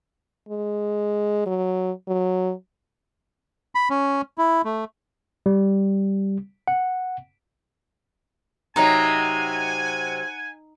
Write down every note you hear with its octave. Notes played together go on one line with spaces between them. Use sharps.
G#3
F#3
F#3
B5
C#4
E4
A3
G3
F#5
C3 F#3 D#4 D#5 F#5 G#5